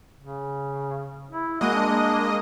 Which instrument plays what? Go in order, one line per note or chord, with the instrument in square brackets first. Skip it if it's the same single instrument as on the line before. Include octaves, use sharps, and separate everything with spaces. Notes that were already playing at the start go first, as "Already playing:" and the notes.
[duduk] C#3
E4
[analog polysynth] G#3 A#3 D#5 [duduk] F#4
[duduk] D4